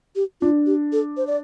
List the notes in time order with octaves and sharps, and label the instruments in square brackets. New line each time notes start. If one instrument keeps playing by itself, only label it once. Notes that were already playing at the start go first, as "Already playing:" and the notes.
[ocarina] G4
[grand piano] D4 [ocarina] F4
[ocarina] G4
A4
C5
D5